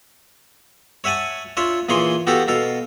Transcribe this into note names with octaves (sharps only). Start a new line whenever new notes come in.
C#5 E5 F#5 G#5 A5
D4 F4 C#5 E5
A#2 E3 G#4 C#5 C6
B3 F#4 G4 A4 F5
B2 A4 F5